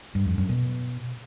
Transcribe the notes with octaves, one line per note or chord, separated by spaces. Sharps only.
G2
F2
F#2
B2